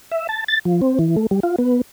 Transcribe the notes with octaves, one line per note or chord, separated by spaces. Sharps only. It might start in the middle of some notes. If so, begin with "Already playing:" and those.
E5
A5
A6
F3
C4
E3
A3
G3
F4
B3